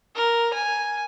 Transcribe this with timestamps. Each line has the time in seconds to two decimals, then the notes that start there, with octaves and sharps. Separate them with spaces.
0.15 A#4
0.53 G#5